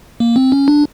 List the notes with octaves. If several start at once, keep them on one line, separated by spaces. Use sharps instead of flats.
A#3
C4
C#4
D4